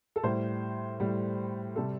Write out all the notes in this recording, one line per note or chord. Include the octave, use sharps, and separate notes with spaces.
A4
A2 G3 C5
A2 G3
C3 G3 A4